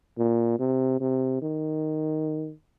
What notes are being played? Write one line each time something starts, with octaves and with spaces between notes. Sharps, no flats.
A#2
C3
C3
D#3